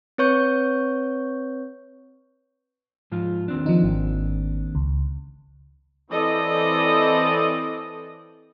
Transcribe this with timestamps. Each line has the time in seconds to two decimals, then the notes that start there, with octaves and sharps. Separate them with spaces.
0.18 C4 B4 C#5 C#6 G6
3.12 G#2 F3 F4
3.48 D#2 C4 D4
3.66 F3 D#4
3.84 G#1
4.75 C#2
6.11 E3 C4 A4 D5 D#5